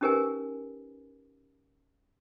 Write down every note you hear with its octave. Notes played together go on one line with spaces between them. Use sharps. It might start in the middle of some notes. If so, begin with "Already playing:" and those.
C#4 D#4 G4 A#4 B4 G#5